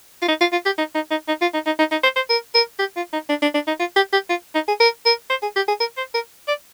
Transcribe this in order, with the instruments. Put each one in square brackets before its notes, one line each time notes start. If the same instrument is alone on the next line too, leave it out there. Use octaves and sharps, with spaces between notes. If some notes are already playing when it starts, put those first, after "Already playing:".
[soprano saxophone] F4
D#4
F4
F4
G4
D#4
D#4
D#4
D#4
F4
D#4
D#4
D#4
D#4
C5
C5
A#4
A#4
G4
F4
D#4
D4
D4
D4
D#4
F4
G4
G4
F4
D#4
G#4
A#4
A#4
C5
G#4
G4
G#4
A#4
C5
A#4
D5